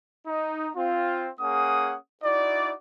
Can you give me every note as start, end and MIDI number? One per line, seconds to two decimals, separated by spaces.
0.26 0.68 63
0.76 1.28 60
0.76 1.28 65
1.40 1.95 58
1.40 1.95 61
1.40 1.95 68
1.40 1.95 78
1.40 1.95 87
2.23 2.73 63
2.23 2.73 64
2.23 2.73 66
2.23 2.73 74